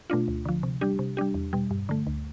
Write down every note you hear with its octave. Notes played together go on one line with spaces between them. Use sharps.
B2 A3 D4 F4
D2
D3 F3
C3
G3 D4 G4
C3
G3 D4 G4
E2
B2 G3
G2
D3 A3
D2